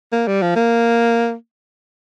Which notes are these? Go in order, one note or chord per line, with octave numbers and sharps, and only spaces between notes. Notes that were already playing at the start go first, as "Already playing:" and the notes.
A#3
G3
F3
A#3